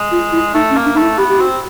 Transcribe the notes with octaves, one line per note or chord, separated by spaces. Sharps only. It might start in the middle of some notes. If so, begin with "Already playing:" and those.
Already playing: G#3
F4
E4
A3 D#4
C#4
A#3
D4
A3 D#4
E4
B3 G4
G4
C4 F#4